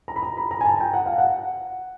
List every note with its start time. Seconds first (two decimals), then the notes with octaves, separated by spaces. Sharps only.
0.08 A#5
0.16 B5
0.23 A#5
0.37 B5
0.51 A#5
0.61 G#5
0.66 A5
0.80 G5
0.93 F#5
1.06 F5
1.18 F#5